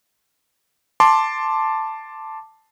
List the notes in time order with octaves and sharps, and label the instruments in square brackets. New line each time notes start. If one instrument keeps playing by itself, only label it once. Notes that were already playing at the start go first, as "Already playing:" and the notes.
[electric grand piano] A5 C6 D6